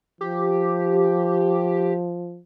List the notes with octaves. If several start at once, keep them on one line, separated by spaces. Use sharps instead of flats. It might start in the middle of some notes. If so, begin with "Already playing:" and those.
F3 G4